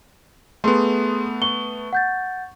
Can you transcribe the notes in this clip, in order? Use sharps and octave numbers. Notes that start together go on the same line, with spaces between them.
A3 B3 G#4 C6
C#6 G7
F#5 G6 A6